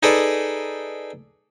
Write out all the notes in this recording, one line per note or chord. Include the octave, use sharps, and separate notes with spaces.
D#4 G#4 A4 B4 D5